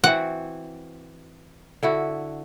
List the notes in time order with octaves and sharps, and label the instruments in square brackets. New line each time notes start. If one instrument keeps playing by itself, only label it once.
[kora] E3 C4 F#4 [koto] F#5
[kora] D3 E4 F#4